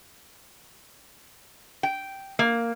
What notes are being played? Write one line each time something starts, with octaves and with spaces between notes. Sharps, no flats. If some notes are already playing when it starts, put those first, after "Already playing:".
G5
A#3